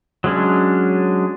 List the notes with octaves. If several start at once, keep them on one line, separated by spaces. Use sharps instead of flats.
F#3 G#3 C#4 D4